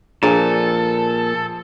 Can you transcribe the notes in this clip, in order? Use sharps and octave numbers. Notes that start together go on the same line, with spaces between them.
A#2 F3 D4 G#4 A4 G#5 A#5